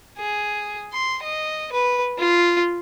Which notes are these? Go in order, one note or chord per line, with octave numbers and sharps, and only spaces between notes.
G#4
C6
D#5
B4
F4